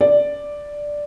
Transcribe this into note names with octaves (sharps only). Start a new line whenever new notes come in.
D5